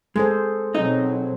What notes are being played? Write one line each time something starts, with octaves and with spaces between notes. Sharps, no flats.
G#3 G#4 A4 C5
B2 F#3 C4 D#4 D#5